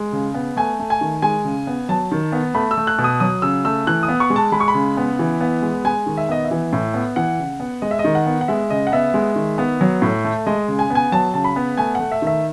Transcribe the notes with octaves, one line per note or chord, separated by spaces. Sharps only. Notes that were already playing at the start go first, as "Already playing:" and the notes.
Already playing: G#3
C#3
B3
A3 G#5
A3
G#5
D#3
G#3 G#5
C#3
B3
F#3 A5
D#3
B3
A3 B5
E6
A3
F#6
B2
D#6
F#3 D#6
C#3 E6
A3 E6
E3 F#6
D#6
B3
C#6
G#3
A5
G#3 B5
C#6
B5
C#3
B3
E3
B3
G#3
G#3 G#5
D#3
E5
B3 D#5
E5
E3
A2
B3
E3 F#5
C#3
B3
G#3 D#5
E5
D#5
D#3
F#5
B3
F#5
G#3 E5
C#3 D#5
F#5
B3 E5
G#3
D#3
B3
F#3
A2
A3
G#3 D#5
C#3
G#5
B3
G#5
F#3 A5
C#3 A5
B5
B3
A3 G#5
A3 F#5
E5
D#3 E5